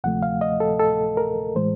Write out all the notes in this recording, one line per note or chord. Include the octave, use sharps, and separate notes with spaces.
D2 C3 F3 A3 F#5
F5
D#5
A4
A4
A#4
A2 E3 G#3 C5